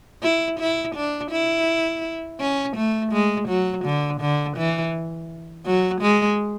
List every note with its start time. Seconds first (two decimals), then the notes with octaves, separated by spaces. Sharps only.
0.23 E4
0.60 E4
0.96 D4
1.32 E4
2.40 C#4
2.77 A3
3.13 G#3
3.49 F#3
3.85 D3
4.21 D3
4.57 E3
5.66 F#3
6.02 G#3